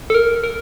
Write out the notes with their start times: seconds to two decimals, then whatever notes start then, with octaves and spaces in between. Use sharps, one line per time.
0.10 A4
0.14 A#4
0.44 A#4